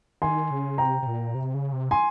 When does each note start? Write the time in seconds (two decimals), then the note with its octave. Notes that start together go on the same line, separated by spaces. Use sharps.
0.22 D#3 G#5 C6
0.51 C#3
0.78 C3 G5 A#5
1.03 C3
1.07 A#2
1.35 C3
1.54 C#3
1.73 C3
1.91 G#5 C6